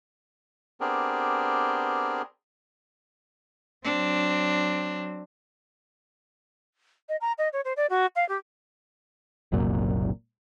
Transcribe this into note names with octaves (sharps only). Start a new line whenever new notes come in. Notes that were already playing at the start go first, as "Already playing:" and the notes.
B3 C4 D4 G4 G#4 A#4
F#3 C4 D4
D#5
A#5
D#5
C#5
C5
D5
F#4
F5
G4
F#1 C2 F#2 A#2